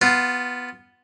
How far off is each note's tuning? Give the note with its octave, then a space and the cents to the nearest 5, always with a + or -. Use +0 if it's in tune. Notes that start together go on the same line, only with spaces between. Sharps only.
B3 +0 F4 +0